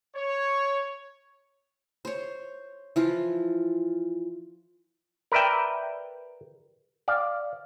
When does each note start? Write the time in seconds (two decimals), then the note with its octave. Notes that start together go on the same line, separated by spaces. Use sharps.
0.15 C#5
2.05 C5 C#5
2.96 E3 F3 F4
5.32 A#4 B4 D5 E5 G5
7.08 D5 F5